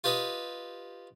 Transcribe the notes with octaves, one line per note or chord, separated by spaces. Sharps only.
F4 G4 B4 D#5